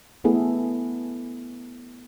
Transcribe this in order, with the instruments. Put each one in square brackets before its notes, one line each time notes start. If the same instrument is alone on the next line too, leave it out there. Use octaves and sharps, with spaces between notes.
[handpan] A3 B3 E4 G#4 A4